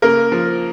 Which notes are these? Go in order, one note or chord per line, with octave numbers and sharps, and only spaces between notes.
C#3 A#3 A#4
F3